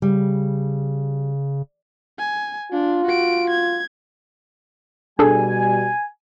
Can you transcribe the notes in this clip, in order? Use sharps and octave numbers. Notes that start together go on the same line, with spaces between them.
C#3 G3
G#5
D4 F4
F#4 D7
G#6
B2 G3 D4 G#4 A4 G#5